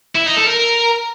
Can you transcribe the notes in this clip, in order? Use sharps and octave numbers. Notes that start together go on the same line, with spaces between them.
E4
D#4
A4
A#4